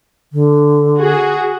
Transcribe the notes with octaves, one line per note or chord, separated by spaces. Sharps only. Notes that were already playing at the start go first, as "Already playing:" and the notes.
D3
F#4 G#4